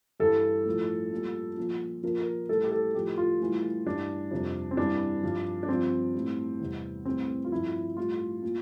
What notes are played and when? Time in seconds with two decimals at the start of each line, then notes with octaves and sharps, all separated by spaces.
0.20 G2 E3 G3 A4
0.65 A2 F3
1.12 A#2 G3
1.57 A#2 F3
2.03 A#2 F3 A#4
2.19 A#4
2.49 A2 E3 G3 A4
2.63 G4
2.71 A4
2.94 A2 F3 G4
3.18 F4
3.40 A2 E3 G3
3.86 G2 E3 G3 D4
4.31 F2 C3 G3
4.71 C4
4.77 G2 E3 G3 D4
5.23 G2 F3
5.63 D4
5.68 G2 F3 C4
6.14 A2 G3
6.60 E2 C3 G3
7.05 A2 E3 G3 C4
7.45 F4
7.52 G2 F3 E4
7.97 A2 G3 F4
8.42 A#2